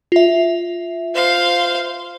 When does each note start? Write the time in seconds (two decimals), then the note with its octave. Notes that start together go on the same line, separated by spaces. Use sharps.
0.12 F4 E5
1.14 C5 F5